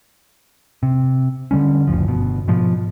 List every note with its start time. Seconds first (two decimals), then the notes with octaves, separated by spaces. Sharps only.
0.83 C3
1.51 D3 D#3 G3 C#4
1.87 F#1 D2 F3
2.06 G1 B2
2.48 G#2 B2 F3